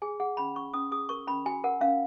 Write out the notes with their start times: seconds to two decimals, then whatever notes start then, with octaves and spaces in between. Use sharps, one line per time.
0.02 G#4 G#5
0.20 G#4 F#5
0.37 C#4 B5
0.55 C#4 C#6
0.74 C#4 D#6
0.92 G#4 D#6
1.09 A#4 C#6
1.27 C#4 B5
1.46 F#4 G#5
1.64 A#4 F#5
1.81 C#4 F5